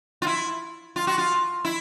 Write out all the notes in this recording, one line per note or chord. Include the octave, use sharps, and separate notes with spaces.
F4
E4
F4
F#4
F4
E4